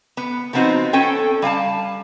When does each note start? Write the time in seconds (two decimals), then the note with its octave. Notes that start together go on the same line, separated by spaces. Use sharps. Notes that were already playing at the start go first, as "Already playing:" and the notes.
0.17 B3
0.53 F3 F#3 B3 C4 D#4 F#4
0.93 C#4 A4 G5
1.42 G3 F5 G5 A5